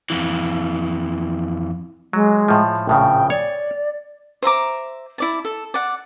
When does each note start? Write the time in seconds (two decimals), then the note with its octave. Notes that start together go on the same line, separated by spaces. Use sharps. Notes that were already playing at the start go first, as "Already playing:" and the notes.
0.10 F2 E3
2.13 F#3 G#3
2.48 A2 F3
2.87 A#1 A2 C#3 G5
3.30 C#5 D5
4.42 C5 E5 A#5 D6
5.18 E4 D5 A5
5.45 A4
5.74 D5 F#5